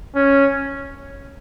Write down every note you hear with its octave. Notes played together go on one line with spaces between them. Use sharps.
C#4